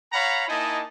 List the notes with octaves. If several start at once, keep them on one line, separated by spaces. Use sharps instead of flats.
C#5 F5 F#5 A#5 B5
A#3 D#4 E4 D#5 G#5 A5